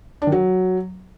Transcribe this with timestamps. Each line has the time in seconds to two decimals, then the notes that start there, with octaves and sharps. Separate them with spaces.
0.22 D4
0.27 D#3
0.32 F#3